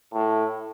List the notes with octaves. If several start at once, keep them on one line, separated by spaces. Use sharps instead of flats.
A2